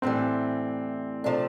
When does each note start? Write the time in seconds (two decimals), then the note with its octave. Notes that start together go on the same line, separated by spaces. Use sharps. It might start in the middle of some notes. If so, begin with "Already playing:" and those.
0.02 A2 E3 G3 C4
1.24 C3 F3 A3 D4